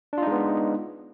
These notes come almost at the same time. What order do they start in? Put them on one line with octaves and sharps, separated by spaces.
D4 F4 D#4 G#3 B3